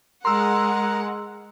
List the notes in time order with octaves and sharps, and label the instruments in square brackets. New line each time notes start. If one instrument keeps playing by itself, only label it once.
[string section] G#3 F#5 [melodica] A#4 A#5 [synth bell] C6 E6